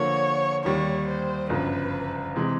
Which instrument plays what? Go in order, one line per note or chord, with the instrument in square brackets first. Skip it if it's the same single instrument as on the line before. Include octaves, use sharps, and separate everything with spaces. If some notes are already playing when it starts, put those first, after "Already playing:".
Already playing: [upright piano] D3 F3 A#3 [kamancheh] C#5
[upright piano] D#2 D#3 G3 [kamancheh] C#5
[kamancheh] C5
[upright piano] G1 F#2 C#3 F3 [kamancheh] B4
[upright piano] C3 E3 G#3